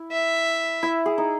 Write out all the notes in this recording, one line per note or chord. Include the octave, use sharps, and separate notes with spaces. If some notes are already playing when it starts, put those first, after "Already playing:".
Already playing: E4
E5
E4
G#4
D#4